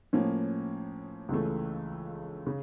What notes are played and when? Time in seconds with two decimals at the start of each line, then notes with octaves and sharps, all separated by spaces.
0.13 A2 F3 A#3 C#4
1.29 C#2 C#3 E3 A3
2.47 C#3